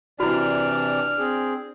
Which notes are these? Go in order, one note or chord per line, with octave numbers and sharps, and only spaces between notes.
C3 E3 D4 E4 F#4 D5 F6
C4 G#4